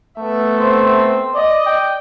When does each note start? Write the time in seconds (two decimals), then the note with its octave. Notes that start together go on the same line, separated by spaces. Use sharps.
0.19 A3 B3 E5
0.59 C4
1.35 D5 D#5
1.66 G5